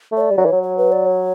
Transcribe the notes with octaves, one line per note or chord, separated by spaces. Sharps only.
A3
C#5
D5
G3
F#3
E3
F#3 C#5
C#5
B4
D5
C#5